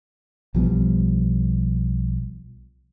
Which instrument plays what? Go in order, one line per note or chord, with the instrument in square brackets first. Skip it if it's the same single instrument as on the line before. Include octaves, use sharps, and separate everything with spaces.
[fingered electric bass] B1 F3 G3 B3